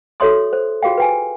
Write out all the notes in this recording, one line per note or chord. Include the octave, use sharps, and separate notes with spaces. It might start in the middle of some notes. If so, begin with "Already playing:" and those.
F#4 A4 C#5 E5 C6 D#6
C5
F4 F#4 G#4 F5 G5
B4 G5 G#5